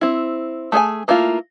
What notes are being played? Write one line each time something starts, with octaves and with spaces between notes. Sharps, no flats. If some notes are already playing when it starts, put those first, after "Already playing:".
C4 E4
A3 G#4 D5 G#5
A3 A#3 E4 F4